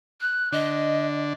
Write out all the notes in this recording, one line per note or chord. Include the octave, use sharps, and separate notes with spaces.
F#6
D3 D4 D#5